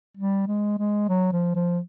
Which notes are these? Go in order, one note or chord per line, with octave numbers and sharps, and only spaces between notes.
G3
G#3
G#3
F#3
F3
F3